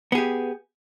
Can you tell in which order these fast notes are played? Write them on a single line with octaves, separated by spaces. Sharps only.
B3 G#4 G4